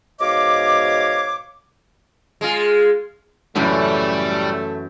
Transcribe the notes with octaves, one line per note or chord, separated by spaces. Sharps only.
G#2 B2 C#5 D#5 F5 D6
G#3 F4
F#2 A2 C#3 E3 G3 A3